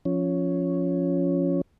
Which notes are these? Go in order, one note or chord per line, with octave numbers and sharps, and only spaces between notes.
F3 C#4